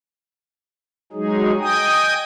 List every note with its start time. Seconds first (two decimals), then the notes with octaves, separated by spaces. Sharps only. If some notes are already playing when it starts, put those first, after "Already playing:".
1.13 F#3 G#3 D#4 G#4
1.60 D#5 G5 G#5 D#6